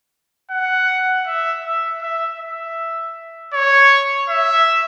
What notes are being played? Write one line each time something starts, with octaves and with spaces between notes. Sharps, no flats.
F#5
E5
E5
E5
E5
C#5
E5